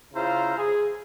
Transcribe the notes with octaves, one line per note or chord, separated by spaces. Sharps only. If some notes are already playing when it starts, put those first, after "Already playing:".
C#3 E4 F4 C5 F5 A#5
G#4